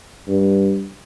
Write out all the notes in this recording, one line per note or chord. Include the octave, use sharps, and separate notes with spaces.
G2